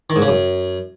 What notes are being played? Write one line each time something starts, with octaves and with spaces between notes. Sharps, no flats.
D#3
G#2
C#3
F#2